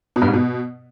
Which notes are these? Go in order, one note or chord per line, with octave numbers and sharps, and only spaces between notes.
B2
G2
G#2
B2